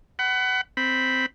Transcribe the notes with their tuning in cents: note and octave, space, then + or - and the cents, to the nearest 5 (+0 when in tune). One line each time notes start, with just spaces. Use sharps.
F#5 +25 B5 +15
C4 -5 B5 +0